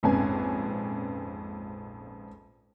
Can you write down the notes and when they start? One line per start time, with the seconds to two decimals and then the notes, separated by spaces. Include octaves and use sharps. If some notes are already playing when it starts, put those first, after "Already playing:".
0.03 A#1 F2 G#2 C#4 B4 G#5